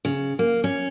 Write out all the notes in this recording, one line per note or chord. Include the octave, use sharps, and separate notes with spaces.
C#3
A#3
C#4